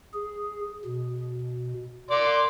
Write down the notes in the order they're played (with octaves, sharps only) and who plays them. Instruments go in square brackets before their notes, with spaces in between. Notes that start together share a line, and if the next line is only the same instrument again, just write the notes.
[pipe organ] G#4
B2
[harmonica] D5 C6 [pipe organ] D6